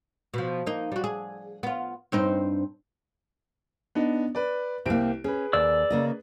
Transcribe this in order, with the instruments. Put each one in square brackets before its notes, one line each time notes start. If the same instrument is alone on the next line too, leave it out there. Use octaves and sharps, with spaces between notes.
[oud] B2 F3
A#3 D#4
G3 F#4
G#4
B3 F4
G2 C4 D#4
[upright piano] B3 D4 D#4
B4 D5
[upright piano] C2 G4 D7 [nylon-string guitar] A#3 C4
[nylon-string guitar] C#4 [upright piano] G#4 B4
[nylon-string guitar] D#2 [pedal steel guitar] D5 E6
[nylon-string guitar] C#3 A#3 D#5